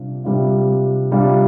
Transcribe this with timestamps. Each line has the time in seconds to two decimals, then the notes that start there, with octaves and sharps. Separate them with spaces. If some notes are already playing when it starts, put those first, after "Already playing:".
Already playing: C3 G3 D4 F4
0.24 C3 G3 D4 F4
1.11 C3 G3 D4 F4